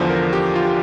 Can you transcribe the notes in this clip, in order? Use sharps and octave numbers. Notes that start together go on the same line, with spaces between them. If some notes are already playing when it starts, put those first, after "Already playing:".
Already playing: E2 D3 F3 C5
A#4
G4
F4
G4